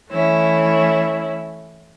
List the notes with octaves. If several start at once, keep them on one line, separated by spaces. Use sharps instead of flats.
E3 A3 C#4 E4